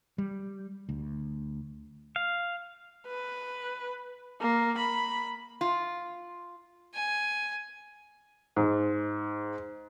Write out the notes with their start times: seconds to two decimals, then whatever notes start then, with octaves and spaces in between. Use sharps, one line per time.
0.18 G3
0.89 D2
2.16 F5
3.08 B4
4.41 A#3
4.78 B5
5.61 F4
6.95 G#5
8.56 G#2